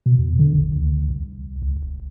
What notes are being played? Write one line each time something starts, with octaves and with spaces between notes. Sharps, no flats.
B2
E2
D3
A1
D2
C2
C#2
D#1